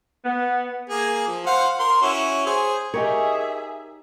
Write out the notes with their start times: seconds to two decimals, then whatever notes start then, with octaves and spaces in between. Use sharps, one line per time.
0.24 B3
0.90 A#3 G#4
1.27 F3
1.46 C5 F5 F#5
1.79 A#4 C6
2.02 C#4 E4 F#4
2.46 G#4 C5
2.94 D#4 G4 G#4 A#4 C#5 E5